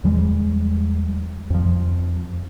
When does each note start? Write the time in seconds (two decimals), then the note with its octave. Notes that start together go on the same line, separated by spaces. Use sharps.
0.04 E2 F3 G3 G#3
1.50 F2 F3